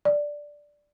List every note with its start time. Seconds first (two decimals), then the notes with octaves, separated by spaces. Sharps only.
0.05 D5